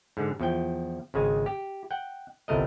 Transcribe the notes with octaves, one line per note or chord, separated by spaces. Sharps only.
G#2 D3
E2 F3 G5
G#1 C#3 G#3 G#5
G4
F#5 G5
G1 C2 A3 A#4 D#5